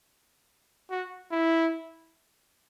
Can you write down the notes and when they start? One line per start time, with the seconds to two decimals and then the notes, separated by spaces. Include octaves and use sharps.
0.90 F#4
1.31 E4